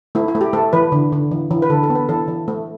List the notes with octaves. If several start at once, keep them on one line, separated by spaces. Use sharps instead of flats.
A3 E4
E4
A3
G4
A3 A4
E3 B4
D3
D3
E3
E3
B4
D3 A4
A4
B3
B4
E3 A4
E3
A3